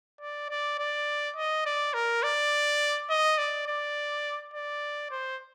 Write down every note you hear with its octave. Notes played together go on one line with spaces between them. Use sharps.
D5
D5
D5
D#5
D5
A#4
D5
D#5
D5
D5
D5
C5